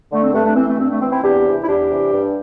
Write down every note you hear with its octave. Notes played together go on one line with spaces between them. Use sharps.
D3 A3
C4
G2 A3 D4
A3 D4
E3 C4
A3
G2 C4
A3
E3 C4
C4 E4
E2 D4 G4
C3 E3
E4
E2 D4 G4
C3 E3
G2